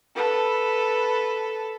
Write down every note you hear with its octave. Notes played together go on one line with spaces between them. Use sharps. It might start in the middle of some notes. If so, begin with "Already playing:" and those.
A4 B4